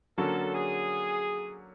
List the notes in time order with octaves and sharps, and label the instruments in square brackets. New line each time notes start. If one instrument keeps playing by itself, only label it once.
[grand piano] D3 F#3 A#3 C#4 F#4 [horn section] A4
[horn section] G#4